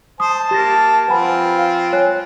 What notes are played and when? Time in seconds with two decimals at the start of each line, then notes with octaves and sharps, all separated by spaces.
0.20 C5 A5 D#6
0.51 A#3 G4 A6 A#6
1.08 F3 C4 B4 F#5 G#5 B5
1.58 F5
1.93 C#5 G#5 F#6